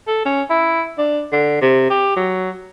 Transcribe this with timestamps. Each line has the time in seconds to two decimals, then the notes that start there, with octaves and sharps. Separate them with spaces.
0.07 A4
0.25 C#4
0.50 E4
0.98 D4
1.32 D3
1.61 C3
1.90 G4
2.16 F#3